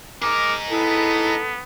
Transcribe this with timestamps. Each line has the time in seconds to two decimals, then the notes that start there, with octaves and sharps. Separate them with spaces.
0.22 D#4 G#4 A#4 D6
0.71 B3 E4 A4